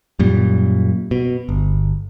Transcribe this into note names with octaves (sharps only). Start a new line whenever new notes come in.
F#2 A#2 G3
B2
G1